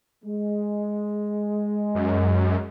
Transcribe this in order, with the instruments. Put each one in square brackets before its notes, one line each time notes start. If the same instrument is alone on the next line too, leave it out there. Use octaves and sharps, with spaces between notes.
[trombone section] G#3
[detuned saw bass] F#2